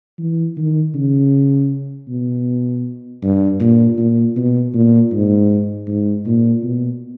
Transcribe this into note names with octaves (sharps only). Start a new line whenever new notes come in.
E3
D#3
C#3
B2
G2
A#2
A#2
B2
A#2
G#2
G#2
A#2
B2